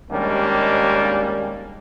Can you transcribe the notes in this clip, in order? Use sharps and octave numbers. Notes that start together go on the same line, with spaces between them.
D#2 G3 G#3 A#3 C#4 D4